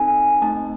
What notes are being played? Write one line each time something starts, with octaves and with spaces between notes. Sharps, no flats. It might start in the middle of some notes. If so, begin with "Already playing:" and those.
Already playing: C4 D#4 A4 G#5
A3 C4 D#4 A5